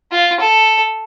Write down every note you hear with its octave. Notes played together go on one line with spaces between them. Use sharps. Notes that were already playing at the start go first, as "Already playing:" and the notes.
F4
A4